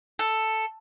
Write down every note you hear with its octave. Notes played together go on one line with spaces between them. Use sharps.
A4